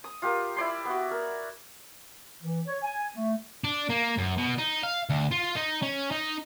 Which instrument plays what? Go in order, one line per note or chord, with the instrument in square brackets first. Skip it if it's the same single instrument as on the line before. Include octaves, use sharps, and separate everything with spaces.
[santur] D#6
F4 G4 A#4
E4 D5 C6
B3 F#4
A#4
[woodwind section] E3
C#5
G#5
A3
[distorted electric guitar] D4
A#3
F#2
B2
D#4
F5
D2
F4
D#4
C#4
D#4